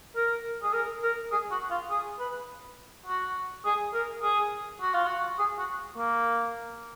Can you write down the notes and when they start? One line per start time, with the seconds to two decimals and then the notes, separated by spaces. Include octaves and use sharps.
0.16 A#4
0.63 G#4
0.73 A#4
1.03 A#4
1.32 G#4
1.51 F#4
1.70 F4
1.90 G#4
2.19 B4
3.06 F#4
3.65 G#4
3.93 A#4
4.22 G#4
4.81 F#4
4.94 F4
5.06 F#4
5.39 G#4
5.59 F#4
5.97 A#3